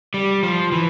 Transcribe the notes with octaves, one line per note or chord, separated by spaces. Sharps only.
G3
F3
E3